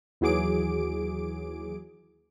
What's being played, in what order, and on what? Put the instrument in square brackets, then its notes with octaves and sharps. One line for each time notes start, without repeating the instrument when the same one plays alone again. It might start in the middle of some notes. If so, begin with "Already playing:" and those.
[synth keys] D#2 E3 F#3 G#4 D6 D7